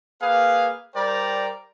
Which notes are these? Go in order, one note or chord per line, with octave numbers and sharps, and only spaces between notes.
A#3 G#4 B4 F5
G3 A#4 C5 D5 G5 A#5